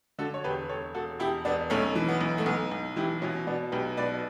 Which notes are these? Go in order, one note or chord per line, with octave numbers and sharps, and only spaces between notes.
D3 F#4 A4
C#5
E1 G4 B4
E1 A4 C#5
E1 F#4 A4
E1 E4 G4
E1 B3 D4
B1 A3 C#4
E3
B3
B1
A3
B1 B3
B1
E3 E4 G4
B2 C#4 E4
B2 B3 D4
B1 G4 B4
B2 B4 D5